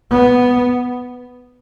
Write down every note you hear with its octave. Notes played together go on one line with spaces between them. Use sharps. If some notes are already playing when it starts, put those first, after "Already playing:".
B3